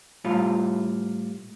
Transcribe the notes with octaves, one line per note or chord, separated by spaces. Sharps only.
A2 G3 F4